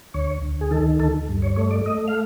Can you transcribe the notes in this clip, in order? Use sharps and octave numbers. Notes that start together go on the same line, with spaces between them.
D2 C#5
D2
G#4
D#3 A4
D2 A4
G2
C#5
A3 C#5
D5
A3 D#5
F5